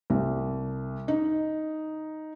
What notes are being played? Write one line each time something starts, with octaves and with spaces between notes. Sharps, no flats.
C2
D#4